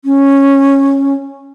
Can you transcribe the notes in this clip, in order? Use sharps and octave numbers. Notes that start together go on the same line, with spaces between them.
C#4